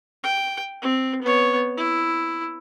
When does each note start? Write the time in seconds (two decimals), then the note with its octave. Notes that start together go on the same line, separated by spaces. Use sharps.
0.24 G5
0.82 C4
1.22 B3 C#5
1.77 E4